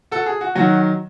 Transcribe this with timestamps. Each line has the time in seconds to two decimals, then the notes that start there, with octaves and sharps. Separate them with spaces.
0.11 F#4 A4
0.26 G#4
0.41 F#4
0.55 D#3 F#3 F#4